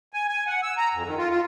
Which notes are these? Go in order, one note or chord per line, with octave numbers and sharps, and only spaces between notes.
G#5
G#5
F#5
E6
A#5
F2
D#3
F4
F4